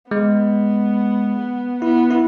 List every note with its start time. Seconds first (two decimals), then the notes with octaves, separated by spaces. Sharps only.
0.11 G#3 B3
1.82 B3 E4
2.11 E4